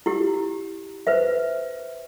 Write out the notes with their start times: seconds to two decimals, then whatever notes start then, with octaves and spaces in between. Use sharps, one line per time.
0.06 E4 G4
1.07 B4 C5 E5